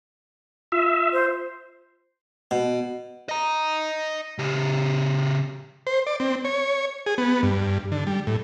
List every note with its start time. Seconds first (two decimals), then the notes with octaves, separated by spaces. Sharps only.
0.72 F4 E5
1.13 C5
2.51 B2
3.29 D#5 A#5
4.38 C#3 G4
5.87 C5
6.07 D5
6.20 C4
6.45 C#5
7.06 G#4
7.18 B3
7.43 G2
7.92 D3
8.07 G3
8.27 A2